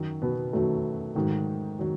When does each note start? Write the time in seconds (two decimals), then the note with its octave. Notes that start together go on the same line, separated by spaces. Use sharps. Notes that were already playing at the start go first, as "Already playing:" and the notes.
Already playing: F#2 D#3 F#3
0.22 B2 B3
0.53 F#2 D#3 F#3 A3
1.15 G#2 D#3 F#3
1.79 D#3 F#3